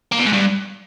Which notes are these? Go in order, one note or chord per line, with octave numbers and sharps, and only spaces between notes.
A#3
B2
G#2
G2